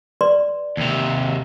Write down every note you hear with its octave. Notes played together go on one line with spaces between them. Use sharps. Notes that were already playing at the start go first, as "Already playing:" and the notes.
B4 D5 C6
D#2 C3